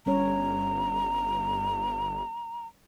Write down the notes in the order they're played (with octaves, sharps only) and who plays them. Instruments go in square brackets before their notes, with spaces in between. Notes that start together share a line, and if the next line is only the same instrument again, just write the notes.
[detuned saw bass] G1 [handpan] G3 C#4 C#5 [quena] A#5